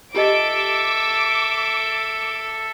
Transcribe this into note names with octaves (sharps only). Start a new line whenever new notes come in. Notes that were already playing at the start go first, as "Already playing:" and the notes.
F4 G4 A4 D#5 E5 D6 D7